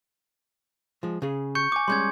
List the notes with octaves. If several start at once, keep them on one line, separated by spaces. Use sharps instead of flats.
F3 G#3
C#3 G#4
C#6 G6 C#7
G#5 D6
G3 G#3 C#4 C6 G6 G#6